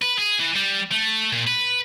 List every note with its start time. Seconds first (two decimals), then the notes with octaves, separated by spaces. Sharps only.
0.02 B4
0.18 G#4
0.39 E3
0.56 G3
0.92 A3
1.32 A#2
1.47 B4